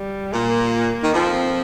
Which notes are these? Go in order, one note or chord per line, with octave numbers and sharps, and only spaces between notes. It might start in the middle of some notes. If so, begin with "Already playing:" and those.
Already playing: G3
A#2 A#3
D#3
F2 F3 C4